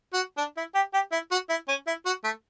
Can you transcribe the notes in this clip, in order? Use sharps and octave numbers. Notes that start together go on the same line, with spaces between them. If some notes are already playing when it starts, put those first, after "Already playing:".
F#4
D4
E4
G4
G4
E4
F#4
E4
C#4
E4
F#4
A3